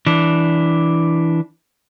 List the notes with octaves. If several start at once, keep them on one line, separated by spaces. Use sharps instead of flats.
E3 D4